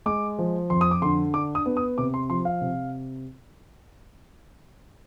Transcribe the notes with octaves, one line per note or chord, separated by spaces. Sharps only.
G#3 D6
F3
F2 C6
D#6
D6
D3 C6
D4 D6
D#6
B3
D#6
C3 D6
C6
F3 C6
F5
C3